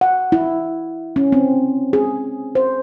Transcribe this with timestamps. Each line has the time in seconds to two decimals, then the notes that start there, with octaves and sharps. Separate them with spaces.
0.01 F#5
0.32 E4
1.16 C#4
1.32 C4
1.93 G#4
2.55 C5